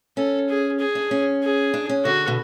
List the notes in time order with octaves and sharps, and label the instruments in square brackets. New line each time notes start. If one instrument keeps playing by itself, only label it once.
[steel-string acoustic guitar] C#4 [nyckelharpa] A4
[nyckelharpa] G#4
G#4
[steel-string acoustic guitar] D4
C#4
[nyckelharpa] G#4
[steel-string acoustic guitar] D4
C#4
[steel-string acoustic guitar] D3 [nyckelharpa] F#4
[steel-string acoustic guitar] B2